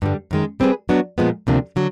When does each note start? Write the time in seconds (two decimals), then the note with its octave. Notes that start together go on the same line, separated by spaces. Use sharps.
0.02 G2 D3 G3
0.31 F#2 D#3 G#3
0.60 G3 C4 E4 G#4 B4
0.89 F#3 B3 D4 F#4
1.18 A#2 F3 G#3 B3
1.47 D2 C3 F3 A#3 D4
1.76 D3 F#3